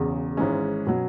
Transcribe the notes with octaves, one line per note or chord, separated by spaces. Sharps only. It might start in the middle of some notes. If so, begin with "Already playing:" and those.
Already playing: E1 E2 C#3
G#1 G#2 E3 G#3 C#4
B2 F#3